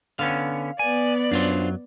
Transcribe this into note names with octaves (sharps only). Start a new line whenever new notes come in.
D3 B3 C#4 F5
B3 D5 G#5
F#2 F#3 D4 F4 C5